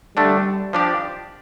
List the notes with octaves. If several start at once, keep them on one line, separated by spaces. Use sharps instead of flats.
D3 G3 A3 D4
F3 D4 G4 D5